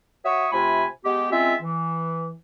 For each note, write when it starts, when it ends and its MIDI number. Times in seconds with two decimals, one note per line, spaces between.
0.25 0.47 66
0.25 0.47 73
0.25 0.47 76
0.25 0.47 85
0.25 0.47 87
0.52 0.85 48
0.52 0.85 57
0.52 0.85 65
0.52 0.85 80
0.52 0.85 83
1.05 1.30 56
1.05 1.30 59
1.05 1.30 67
1.31 1.54 56
1.31 1.54 60
1.31 1.54 61
1.31 1.54 65
1.31 1.54 76
1.62 2.33 52